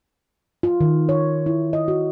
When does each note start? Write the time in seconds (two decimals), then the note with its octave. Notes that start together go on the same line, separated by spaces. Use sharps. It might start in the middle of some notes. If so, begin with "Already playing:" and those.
0.63 F4
0.80 D#3
1.09 C#5
1.46 E4
1.73 D#5
1.88 F#4